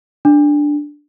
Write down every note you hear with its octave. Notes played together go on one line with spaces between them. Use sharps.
D4